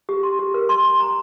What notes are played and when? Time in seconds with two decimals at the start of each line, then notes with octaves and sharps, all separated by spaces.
0.09 G4
0.23 C6
0.39 G4
0.54 A#4
0.69 C6
0.85 C6
1.00 A#5